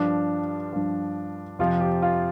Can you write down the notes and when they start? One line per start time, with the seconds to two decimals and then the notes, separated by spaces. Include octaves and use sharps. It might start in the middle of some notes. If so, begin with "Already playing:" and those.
Already playing: G2 F3 D4
0.73 G2 F3
1.59 F2 C3 F3 F4
1.80 G4
2.02 F4